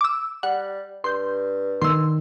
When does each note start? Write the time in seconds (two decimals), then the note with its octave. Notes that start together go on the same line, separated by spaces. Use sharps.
0.01 D6 E6
0.43 G3 F#5
1.04 G2 C6 G6
1.82 D#3 C6 E6